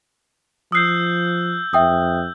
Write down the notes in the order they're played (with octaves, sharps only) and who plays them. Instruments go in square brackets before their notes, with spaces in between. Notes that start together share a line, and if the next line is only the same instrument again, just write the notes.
[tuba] F3 [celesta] D#6 C7 [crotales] E6 F#6 G6
[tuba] F2 [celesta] E5 G5 D#6